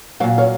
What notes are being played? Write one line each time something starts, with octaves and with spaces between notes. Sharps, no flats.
A#2 F#3 C#5 F5
C#5 F5